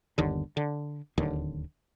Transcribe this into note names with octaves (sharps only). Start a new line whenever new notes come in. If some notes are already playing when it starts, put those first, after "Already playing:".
G1 D#2 D3
D3
D1 D#2 D3